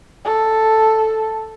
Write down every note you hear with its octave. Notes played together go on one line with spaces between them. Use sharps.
A4